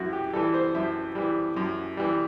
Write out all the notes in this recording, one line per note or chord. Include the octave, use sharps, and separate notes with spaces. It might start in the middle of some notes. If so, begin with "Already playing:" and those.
Already playing: F#2 E3 E4 F#4
G4
E3 G3 A4
C5
F#2 E5
E3 G3
F#2
E3 G3